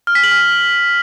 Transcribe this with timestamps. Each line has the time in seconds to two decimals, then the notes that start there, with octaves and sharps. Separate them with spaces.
0.07 F6
0.15 B6
0.23 F#7
0.32 F6